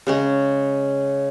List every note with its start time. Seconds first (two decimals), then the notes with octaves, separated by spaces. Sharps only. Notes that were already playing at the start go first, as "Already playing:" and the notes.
0.07 C#3 G#3 C#4